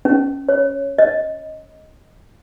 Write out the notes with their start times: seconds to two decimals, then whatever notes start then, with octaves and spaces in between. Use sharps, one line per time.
0.05 C#4
0.49 C#5
0.99 D#5